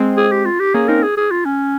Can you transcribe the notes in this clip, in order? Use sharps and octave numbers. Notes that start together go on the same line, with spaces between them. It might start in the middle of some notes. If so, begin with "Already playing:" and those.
Already playing: G#3 C4
G#4
G4
F4
G4
A#3 C#4 G#4
C4 D#4 A#4
G#4
G#4
F4
C#4